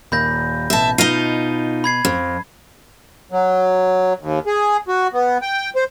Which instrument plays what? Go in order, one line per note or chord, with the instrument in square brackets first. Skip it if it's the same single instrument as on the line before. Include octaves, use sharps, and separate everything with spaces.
[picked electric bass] D#2 A#2 [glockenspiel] B5 G6 A#6
[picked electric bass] A1 B2 [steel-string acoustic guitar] E5 A5
[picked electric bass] B2 [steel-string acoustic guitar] D#4 F4 [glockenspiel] C7 D#7 G7
[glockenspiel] B5 G#6 C7
[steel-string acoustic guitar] F2
[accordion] F#3
D#2
G#4
F#4
B3
G5
C5